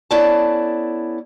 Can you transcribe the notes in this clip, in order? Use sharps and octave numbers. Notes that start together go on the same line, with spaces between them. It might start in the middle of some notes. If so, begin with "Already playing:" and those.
B3 C#4 E4 A4 D5 A5